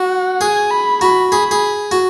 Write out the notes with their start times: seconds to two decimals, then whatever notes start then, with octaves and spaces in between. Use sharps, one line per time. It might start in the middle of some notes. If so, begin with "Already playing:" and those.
Already playing: F#4 F#5
0.41 G#4 G#5
0.71 B5
1.01 F#4 B5
1.31 G#4 B5
1.51 G#4
1.91 F#4